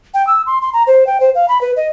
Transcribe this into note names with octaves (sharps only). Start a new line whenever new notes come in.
G5
E6
C6
C6
A#5
C5
G5
C5
F5
B5
B4
D#5